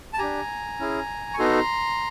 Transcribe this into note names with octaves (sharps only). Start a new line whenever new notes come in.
A5
D4 G4 G#5 A#5
C#4 E4 G#4
C#6
B3 D#4 F#4 A4 A#5 C6